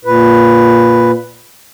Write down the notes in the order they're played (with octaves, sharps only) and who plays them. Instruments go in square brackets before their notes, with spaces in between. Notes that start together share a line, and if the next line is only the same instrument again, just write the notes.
[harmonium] A#2 B4